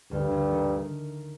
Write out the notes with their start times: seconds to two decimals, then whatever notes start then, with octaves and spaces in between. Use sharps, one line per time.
0.11 D2 G2
0.30 D2
0.51 D#3